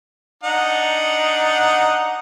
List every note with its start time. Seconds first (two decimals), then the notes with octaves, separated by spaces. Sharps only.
0.44 D4 D#4 F#5